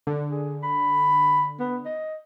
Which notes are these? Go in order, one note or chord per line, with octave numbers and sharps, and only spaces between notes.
D3
G#4
B5
B3
D#5